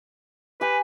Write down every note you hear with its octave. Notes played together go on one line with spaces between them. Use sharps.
G4 B4 G5 G#5